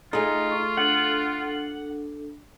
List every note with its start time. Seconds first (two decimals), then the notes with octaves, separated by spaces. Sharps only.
0.13 A3 D#4 F4 G#4
0.51 C#6
0.77 D4 A4 F#5